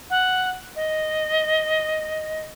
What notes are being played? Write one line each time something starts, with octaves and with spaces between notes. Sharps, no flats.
F#5
D#5